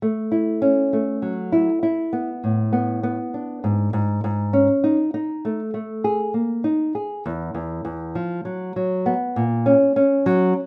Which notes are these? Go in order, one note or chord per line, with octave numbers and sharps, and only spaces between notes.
A3
E4
C#4
A3
F#3
E4
E4
B3
A2
B3
B3
D4
G#2
G#2
G#2
C#4
D#4
D#4
A3
A3
G#4
A#3
D#4
G#4
E2
E2
E2
F3
F#3
F#3
B3
A#2
C#4
C#4
F#3